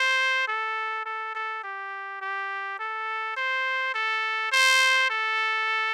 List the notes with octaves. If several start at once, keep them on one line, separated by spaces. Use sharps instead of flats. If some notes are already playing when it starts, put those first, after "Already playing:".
Already playing: C5
A4
A4
A4
G4
G4
A4
C5
A4
C5
A4